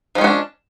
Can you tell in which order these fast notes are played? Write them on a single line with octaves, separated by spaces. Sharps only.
F3 G#3 C#4 F#4 D4